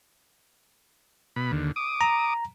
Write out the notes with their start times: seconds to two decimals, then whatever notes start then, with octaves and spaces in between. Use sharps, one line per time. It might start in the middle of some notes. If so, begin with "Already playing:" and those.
1.36 B2 B5
1.52 D#2 D3
1.76 D6 D#6
2.01 A#5